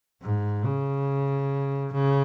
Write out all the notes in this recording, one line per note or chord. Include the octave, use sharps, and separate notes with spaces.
G#2
C#3
C#3